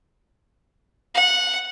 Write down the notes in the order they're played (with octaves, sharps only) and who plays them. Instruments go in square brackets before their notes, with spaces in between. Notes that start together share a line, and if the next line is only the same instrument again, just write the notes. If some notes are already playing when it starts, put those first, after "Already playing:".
[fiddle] F#5